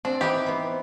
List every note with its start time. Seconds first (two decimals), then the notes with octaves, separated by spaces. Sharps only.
0.05 C4 D4
0.21 E3 D#4 E4 G4
0.46 B3 C5